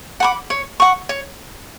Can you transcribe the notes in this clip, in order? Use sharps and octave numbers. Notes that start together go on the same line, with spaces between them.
F#5 B5 D6
C#5
F#5 C#6
C#5